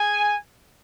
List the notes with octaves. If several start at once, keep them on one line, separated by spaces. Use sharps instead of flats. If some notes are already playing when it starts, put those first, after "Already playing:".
Already playing: G#4 G#5